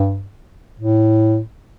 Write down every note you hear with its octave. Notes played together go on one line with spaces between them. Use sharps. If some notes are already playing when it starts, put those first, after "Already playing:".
Already playing: G2
A2